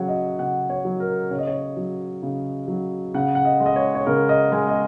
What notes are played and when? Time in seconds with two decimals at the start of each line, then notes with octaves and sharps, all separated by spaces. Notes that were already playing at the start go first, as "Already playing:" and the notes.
Already playing: C#3 F#3 C#5 F#5
0.08 D#5
0.39 C#3 F#5
0.70 C#5
0.85 F#3
1.00 A#4
1.31 C#3 C#5
1.39 D#5
1.47 C#5
1.77 F#3
2.23 C#3
2.68 F#3
3.14 C#3 F#5
3.35 F#5
3.45 D#5
3.60 G#3
3.66 D#5
3.76 C#5
3.95 C#5
4.06 C#3 A#4
4.29 D#5
4.52 G#3 G#5
4.69 D#5